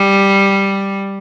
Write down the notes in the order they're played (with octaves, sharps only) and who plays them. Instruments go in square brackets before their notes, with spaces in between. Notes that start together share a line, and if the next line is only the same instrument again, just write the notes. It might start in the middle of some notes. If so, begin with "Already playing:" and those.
Already playing: [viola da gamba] G3